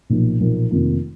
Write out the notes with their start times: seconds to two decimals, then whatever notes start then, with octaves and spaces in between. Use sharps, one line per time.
0.10 B1 A#2 F3 A#3
0.40 B1 A#2 F3 A#3
0.71 F1 F2 D#3 A#3 F4